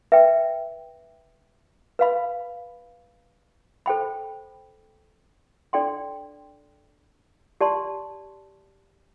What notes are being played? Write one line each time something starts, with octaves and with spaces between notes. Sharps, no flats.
B4 E5 G5
B4 F5 B5
A4 C5 G5 B5
D4 A4 D5 G5 C6
G4 D5 A5 C6